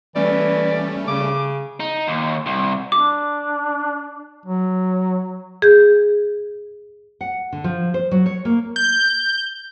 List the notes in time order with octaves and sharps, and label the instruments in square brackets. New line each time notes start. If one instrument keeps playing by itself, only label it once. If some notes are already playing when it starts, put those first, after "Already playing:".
[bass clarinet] E3 [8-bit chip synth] G3 A3 C#4 [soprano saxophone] D5
[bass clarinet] C#3 [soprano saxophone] D6
[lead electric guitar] D#4
D#2
C2
[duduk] D4 [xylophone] D6
[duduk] F#3
[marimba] G#4 G6
[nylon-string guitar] F#5
D3
F3
C5
F#3
C#5
A#3
[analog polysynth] G6